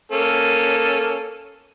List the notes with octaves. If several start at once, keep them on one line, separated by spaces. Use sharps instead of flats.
A#3 C#4 A4